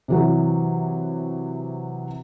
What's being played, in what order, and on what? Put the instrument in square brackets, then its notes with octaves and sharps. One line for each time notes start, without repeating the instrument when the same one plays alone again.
[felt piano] C3 E3 F#3